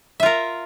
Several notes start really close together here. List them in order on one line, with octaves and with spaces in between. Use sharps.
E5 F4 A#4